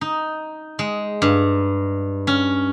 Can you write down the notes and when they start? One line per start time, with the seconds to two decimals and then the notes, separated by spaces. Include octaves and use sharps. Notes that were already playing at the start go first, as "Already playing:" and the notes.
0.01 D#4
0.79 G#3
1.22 G2
2.27 C#4